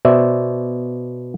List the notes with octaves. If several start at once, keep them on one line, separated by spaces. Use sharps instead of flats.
B2 C5 D5 E5